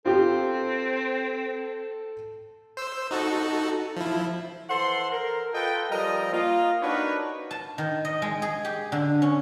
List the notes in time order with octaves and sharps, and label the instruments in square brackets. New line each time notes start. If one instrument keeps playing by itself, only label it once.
[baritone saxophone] C4 [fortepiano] F4 G4 G5 [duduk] A4
[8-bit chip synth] C5 E6
D#4 F#4 A4
F3 E4
[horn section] E3 A4 C5 F#5 C6
A#4
F4 A4 B4 D#5 G5
F3 G3 A#4 D#5
A#3 F4 D#5
D4 D#4 F#4 A#4 B4 C#5
[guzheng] A5
D#3
D#5
G#3
G#4
G4
D3
C#4